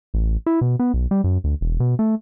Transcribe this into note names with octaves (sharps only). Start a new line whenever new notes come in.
A1
E4
B2
B3
B1
G3
F#2
D2
E1
B2
A3